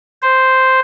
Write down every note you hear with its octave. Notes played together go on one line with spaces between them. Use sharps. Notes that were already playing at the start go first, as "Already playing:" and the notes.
C5